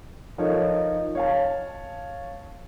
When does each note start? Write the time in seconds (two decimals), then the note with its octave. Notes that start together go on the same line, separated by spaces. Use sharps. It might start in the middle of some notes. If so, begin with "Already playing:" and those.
0.38 F3 D#4 A4 A#4 C#5
1.15 C#5 F5 A5